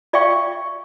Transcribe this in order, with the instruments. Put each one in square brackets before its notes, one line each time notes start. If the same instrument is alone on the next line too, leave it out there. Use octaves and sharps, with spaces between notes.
[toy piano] F4 D5 E5 F5 G5 C#6